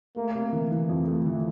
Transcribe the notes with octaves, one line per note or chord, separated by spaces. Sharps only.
A3 A#3
C3
E3
E3
F2
A3
E3